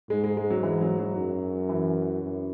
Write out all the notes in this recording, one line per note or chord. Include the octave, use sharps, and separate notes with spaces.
G#2 G#3
G#3
G#3
F#3
E3
F#3
F#3
F#2
E3
F#2